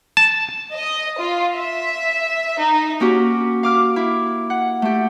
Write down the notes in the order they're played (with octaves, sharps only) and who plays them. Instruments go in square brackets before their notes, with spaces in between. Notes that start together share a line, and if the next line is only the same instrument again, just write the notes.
[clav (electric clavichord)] A5
[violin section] D#5
F4
E5
D#4
[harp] A#3 C#4 F#4 G4
F5 D6 F6
E4
F#5
A3 G4